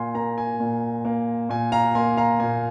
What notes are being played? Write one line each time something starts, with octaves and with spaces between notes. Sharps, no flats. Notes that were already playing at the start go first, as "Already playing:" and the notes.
Already playing: A#2 F5 G#5 C6
A#3 F5 A#5
G#5
A#2
A#3
A#2 G#5
F5 A#5
A#3 G#5 C6
F5 A#5
A#2 G#5